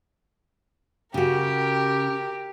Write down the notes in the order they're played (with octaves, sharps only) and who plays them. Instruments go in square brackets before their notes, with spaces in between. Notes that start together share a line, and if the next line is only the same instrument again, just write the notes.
[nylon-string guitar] C#3 F#4 [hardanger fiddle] G4 A#4